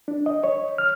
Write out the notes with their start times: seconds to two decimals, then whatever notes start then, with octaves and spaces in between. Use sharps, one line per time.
0.08 D4
0.26 D#5
0.44 C#5
0.78 F6